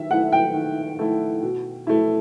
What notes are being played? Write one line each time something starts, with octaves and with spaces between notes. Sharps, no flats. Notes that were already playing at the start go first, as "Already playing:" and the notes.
Already playing: D#3 E5
A3 E4 F#5
G5
D#3
A3 E4
B2
A3 E4